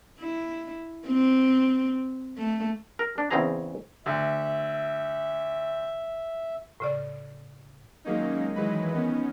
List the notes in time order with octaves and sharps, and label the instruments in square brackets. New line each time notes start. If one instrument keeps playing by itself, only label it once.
[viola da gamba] E4
C4
A3
[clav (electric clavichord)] A#4
D4
E2 C#3 C4 C#4 G#4 A#5
[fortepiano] D2 [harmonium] E5
[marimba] A2 C#3 D5
[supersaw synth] D#3 F#3 G#3 A#3 C#4 D#4
D#3 E3 F#3 G#3 B4
D#3 B3 C#4